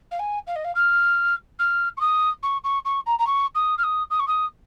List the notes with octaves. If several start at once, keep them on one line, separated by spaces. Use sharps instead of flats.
F5
G#5
F5
D#5
F5
F6
F6
C#6
D#6
C#6
C#6
C#6
A#5
A#5
C#6
D#6
F6
D#6
D#6
C#6
D#6